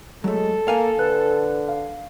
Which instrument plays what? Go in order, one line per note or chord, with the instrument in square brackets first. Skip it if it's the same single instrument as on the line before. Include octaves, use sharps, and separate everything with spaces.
[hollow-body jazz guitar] F#3 A3 [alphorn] G#3 [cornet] A4
[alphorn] A#3 [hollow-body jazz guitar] F5 G#5
[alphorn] D3 [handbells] B4 F#6
[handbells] F5